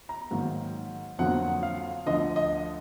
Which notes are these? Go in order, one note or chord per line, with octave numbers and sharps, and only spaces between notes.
A#5
G#2 D#3 F#3 A#3
F2 D3 F#3 A#3 F#5
F5
D2 D3 F3 D#5
D#5